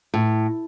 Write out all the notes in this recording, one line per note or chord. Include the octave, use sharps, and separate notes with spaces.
A2